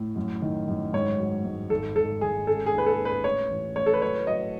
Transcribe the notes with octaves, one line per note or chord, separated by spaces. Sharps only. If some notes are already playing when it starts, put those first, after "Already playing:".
Already playing: A2
F#2
D#3
F#2
G#2 C#5
F#3
G#2
G#1 A4
G#1 A4
G#1 G#4
C#4 A4
G#4
D#2 B4
A4
C#4
B4
A2 C#5
A1
A2 C#5
A4
B4
F#3 C#5
F#3 D#5